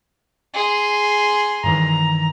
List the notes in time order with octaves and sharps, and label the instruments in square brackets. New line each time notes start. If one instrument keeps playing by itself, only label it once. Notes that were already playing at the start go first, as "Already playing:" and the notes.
[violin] G#4 C6
[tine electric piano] G2 D#3 E3 [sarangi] A#5